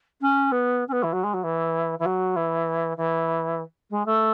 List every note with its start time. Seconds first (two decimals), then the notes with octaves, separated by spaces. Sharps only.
0.21 C#4
0.51 B3
0.88 C#4
0.92 B3
1.03 E3
1.12 F#3
1.23 G#3
1.33 F#3
1.43 E3
1.99 E3
2.05 F#3
2.36 E3
2.97 E3
3.90 G#3
4.05 A3